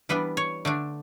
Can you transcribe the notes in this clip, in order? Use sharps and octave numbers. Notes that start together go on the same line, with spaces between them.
E3 G3 B3 D4 B4
C#5
D3 A3 D4